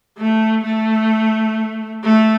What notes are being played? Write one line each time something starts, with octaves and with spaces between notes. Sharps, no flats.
A3
A3
A3